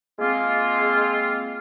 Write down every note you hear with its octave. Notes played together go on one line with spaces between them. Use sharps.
G#3 A#3 C4 F4